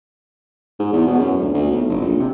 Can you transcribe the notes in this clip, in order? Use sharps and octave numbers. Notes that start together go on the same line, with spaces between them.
G#2
E2
B2
F#2
D2
D2
B1
F#1
A#1
C3